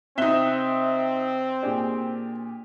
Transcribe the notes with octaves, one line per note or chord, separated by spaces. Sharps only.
C3 C4 D#4 E5 F#6 G7
A#2 D4 G4 G#4